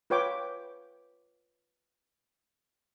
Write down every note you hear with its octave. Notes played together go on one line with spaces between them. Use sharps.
F4 B4 C#5 G5 D6